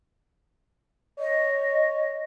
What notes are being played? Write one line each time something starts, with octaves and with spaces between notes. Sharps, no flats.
C#5 D#5